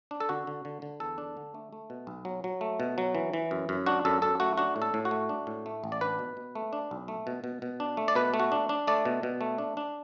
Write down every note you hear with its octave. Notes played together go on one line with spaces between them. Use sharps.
D4
A4
D3 F#4
D3
D3
D3
E2 A4
D4
D3
A3
A3
B2
B1
F#3
F#3
A3
B2
F#3
E3
E3
F#2
F#2
D4 F#4
F#2 A4
F#2 A4
A3 F#4
D4 F#4
A2
A4
A2
F#4
A3
D4
A2
A3
A1
D5
D4 B4
B2
B2
A3
D4
B1
A3
B2
B2
B2
D4
A3
D5
B2 B4
A3
F#4
D4
D4
A3 D5
B2
B2
A3
D4
D4